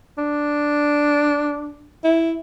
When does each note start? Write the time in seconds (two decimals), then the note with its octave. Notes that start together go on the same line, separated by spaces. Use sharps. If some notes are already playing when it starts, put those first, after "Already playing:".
0.18 D4
2.04 E4